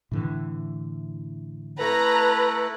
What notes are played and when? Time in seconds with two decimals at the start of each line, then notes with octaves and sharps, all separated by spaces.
0.12 A2 D3 E3
1.80 A3 E4 A4 B4 A#5